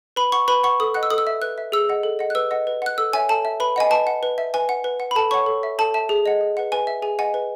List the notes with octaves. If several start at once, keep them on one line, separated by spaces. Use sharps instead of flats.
B4 B5
F#5 C#6
B4 B5
F#5 C#6
A4 D#6
D#5 F#5 F#6
E6
A4 D#6
E6
E5
B4 F#6
E5
G#4 E6
D#5 F#5
A4
D#5 F#5
F#6
B4 E6
D#5 F#5
B4
F#5 F#6
A4 E6
C#5 E5 G#5
A4 A5
E5
B4 B5
D#5 F#5 G#5
B4 A5
F#5
B4
E5
B4 G#5
F#5
B4
F#5
B5
A4 A5
C#5 F#5 C#6
A4
E5
A4 A5
E5 A5
G#4
D#5 F#5
G#4
B4 F#5
B4 G#5
E5
G#4 G#5
D#5 F#5 G#5
B4